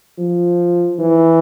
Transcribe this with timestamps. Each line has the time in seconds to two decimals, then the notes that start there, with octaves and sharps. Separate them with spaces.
0.19 F3
1.00 E3